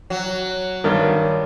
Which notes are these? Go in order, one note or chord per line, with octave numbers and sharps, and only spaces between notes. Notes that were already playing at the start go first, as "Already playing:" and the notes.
F#3
G2 D#3